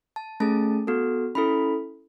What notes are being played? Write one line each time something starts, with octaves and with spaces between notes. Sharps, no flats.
A5
A3 C#4 G#4 A5
B3 F#4 A4
C#4 E4 A4 B5